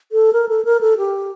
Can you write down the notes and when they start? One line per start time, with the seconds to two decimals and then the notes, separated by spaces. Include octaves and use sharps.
0.12 A4
0.33 A#4
0.49 A4
0.65 A#4
0.81 A4
0.98 G4